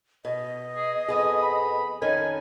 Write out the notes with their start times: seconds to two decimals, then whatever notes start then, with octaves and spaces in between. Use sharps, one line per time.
0.25 B2 D#5
0.75 G#4
1.08 F2 B3 G#4 D#6
1.42 B5
2.02 F2 D#3 C#4 G#5